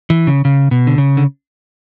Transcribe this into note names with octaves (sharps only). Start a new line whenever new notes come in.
E3
C#3
C#3
B2
D3
C#3
D3